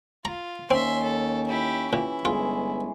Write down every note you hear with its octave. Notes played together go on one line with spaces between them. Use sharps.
F4 A#5
D#2 C4 C#4 E5 C6
A4
E4 G4
A#2 E3 E4
G1 G#3 F4